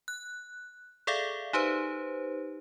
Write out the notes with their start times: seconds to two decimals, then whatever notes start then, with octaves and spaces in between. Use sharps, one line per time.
0.08 F#6
1.07 G#4 A4 D5 E5 F5
1.53 D#4 G4 B4 C5